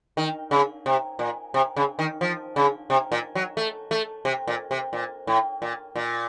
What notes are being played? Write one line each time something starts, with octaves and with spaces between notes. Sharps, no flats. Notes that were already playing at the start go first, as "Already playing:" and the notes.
D#3
C#3
C3
A#2
C3
C#3
D#3
F3
C#3
C3
A#2
F#3
A3
A3
C3
A#2
C3
A#2
A2
A#2
A#2